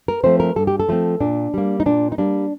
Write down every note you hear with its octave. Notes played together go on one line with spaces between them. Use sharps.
A#4
F3 A3 C4 C5
A#4
G2 A4
G4
A4
F3 A3 C4
A#2 D4
G3 A#3
D#4
A#2 D4
D#4
G3 A#3 D4